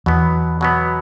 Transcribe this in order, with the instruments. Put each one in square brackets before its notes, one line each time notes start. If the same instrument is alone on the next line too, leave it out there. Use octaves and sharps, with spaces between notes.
[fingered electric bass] E2 [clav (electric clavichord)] B2 F#3 B3
[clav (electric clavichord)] B2 F#3 B3